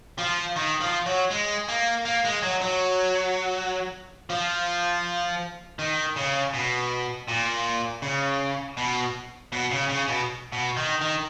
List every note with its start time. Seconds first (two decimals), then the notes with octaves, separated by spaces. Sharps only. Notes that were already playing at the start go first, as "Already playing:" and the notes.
0.19 F3
0.57 D#3
0.81 F3
1.06 F#3
1.30 G#3
1.69 A#3
2.05 A#3
2.25 G#3
2.43 F#3
2.61 F#3
4.30 F3
5.79 D#3
6.16 C#3
6.53 B2
7.28 A#2
8.02 C#3
8.77 B2
9.52 B2
9.71 C#3
9.89 C#3
10.08 B2
10.52 B2
10.77 D#3
11.01 D#3